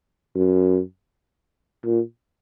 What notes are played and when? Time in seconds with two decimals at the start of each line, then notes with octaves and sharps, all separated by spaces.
0.35 F#2
1.85 A#2